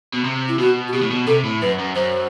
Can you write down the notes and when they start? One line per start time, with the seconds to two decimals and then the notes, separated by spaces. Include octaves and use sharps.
0.13 B2
0.24 C3
0.48 E4
0.59 B2 F#4
0.88 F#4
0.92 B2 G4
1.02 A2
1.11 B2
1.27 C3 A4
1.44 A2
1.62 F#2 B4
1.79 F#2
1.95 F#2 C5